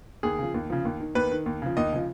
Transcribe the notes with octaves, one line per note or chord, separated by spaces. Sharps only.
D#2 G#4
C#3 F3
D#2
C#3 F3
D#2
D#3
D#2 B4
D#3
D#2
C#3 F3
D#2 D#5
C#3 F3